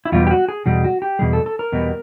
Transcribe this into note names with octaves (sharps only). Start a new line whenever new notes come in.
E4
E2 B2 G3 F4
G4
F#4
G#4
E2 B2 G3 G#4
F#4
G4
E2 B2 G3 G#4
A4
A4
A#4
E2 B2 G3